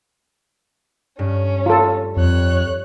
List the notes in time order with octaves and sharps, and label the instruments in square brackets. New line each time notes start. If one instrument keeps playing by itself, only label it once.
[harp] G2 [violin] C#4
[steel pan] F4 A4
[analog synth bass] F2 [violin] C#5 F#6